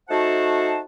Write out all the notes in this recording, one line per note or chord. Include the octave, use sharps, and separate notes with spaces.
A3 D#4 F#4 C5 F#5 A5